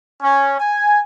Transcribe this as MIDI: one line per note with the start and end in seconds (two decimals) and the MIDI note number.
0.22 0.54 61
0.59 1.01 80